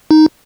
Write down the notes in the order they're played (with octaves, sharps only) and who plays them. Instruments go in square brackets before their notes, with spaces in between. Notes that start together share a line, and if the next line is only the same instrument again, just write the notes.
[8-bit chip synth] D#4